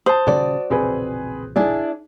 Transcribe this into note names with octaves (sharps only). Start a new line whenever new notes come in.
C5 A5 D#6
D#1 C#3 C#4 F#4 D5
E1 A#1 C#3 C4 G#4 B4
D4 E4 G#4 D5